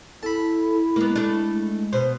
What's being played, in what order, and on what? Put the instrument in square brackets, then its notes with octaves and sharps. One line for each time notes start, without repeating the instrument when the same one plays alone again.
[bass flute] E4 [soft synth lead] A4 [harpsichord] A5 B5
[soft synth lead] G#3 [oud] A#3 B3
[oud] A3 D4
[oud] B2 [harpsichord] C5